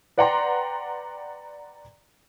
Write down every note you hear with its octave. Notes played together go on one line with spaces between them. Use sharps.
B4 D5 F#5 G5 A#5 C6